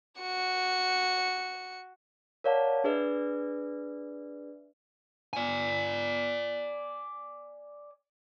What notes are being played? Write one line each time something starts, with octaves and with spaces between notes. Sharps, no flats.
F#4 C#7
A#4 C#5 D5 F5 F#5 A5
D4 G#4 B4 D5 E5
D5 G#5